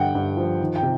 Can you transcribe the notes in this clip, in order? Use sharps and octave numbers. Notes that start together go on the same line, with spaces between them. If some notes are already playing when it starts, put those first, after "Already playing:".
Already playing: G2 D3 F#5 G5
G2
F3
D#3
G5
C3